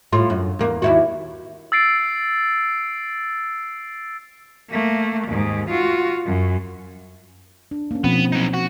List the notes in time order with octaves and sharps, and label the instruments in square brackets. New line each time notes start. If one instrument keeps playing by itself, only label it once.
[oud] A2 F4
F#2
E2 A#3
D#2 E4 F#4
[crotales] E6 A6 C7 D7
[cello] A3 A#3
D#2 G#2
F4 F#4
F#2
[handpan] D4
A#3 C#4
[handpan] B2 F3 C4 [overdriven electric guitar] B3
[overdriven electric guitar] F#3 D#4
F#4